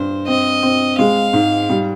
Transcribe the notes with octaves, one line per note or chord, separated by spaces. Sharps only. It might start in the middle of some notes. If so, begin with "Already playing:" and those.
Already playing: G2 C5
C4 D#5
C4
G#3 F5
G#2
G3